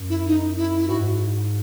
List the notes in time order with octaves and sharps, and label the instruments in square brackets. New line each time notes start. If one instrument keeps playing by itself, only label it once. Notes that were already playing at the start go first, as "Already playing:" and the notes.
Already playing: [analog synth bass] F#2
[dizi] E4
D#4
E4
E4
[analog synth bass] G#2 [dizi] F#4